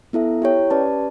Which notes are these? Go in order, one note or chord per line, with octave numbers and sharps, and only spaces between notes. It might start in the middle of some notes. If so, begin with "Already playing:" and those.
B3 E4 A4 E5
E4 G4 C#5 G5
C#4 G4 B4 D5 A5